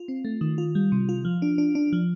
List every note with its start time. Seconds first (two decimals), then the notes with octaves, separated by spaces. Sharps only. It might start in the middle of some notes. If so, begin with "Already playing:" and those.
Already playing: F4
0.08 C4
0.25 A3
0.41 D#3
0.58 F4
0.75 G3
0.92 C3
1.09 F4
1.25 F3
1.42 D4
1.58 D4
1.75 D4
1.93 F3